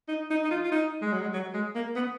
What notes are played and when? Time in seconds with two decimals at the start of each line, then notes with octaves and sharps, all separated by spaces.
0.08 D#4
0.30 D#4
0.44 D#4
0.51 F4
0.64 F4
0.72 D#4
1.02 G#3
1.13 F#3
1.22 G#3
1.33 F#3
1.54 G#3
1.75 A#3
1.95 B3